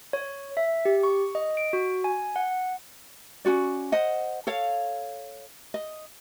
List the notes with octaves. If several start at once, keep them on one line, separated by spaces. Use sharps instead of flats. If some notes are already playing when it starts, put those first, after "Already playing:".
C#5
E5
G4
C#6
D#5
D7
F#4
G#5
F#5
C#4 F4 F#4 D5
C5 D#5 F#5
A4 C#5 F5
D#5